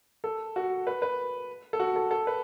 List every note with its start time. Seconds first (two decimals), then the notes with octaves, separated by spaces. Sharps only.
0.24 A4
0.56 F#4
0.87 B4
1.02 B4
1.73 A4
1.80 F#4
1.96 A4
2.11 A4
2.27 B4